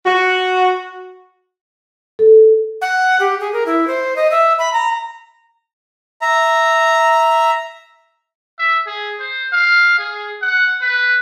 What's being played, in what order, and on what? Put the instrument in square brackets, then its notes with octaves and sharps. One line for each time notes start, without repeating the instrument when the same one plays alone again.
[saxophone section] F#4
[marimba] A4
[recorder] F#5
G4
G#4
A#4
E4
C5
D#5
E5
B5
A#5
[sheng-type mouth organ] E5 A#5
[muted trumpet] E5
G#4
C5
F5
G#4
F#5
B4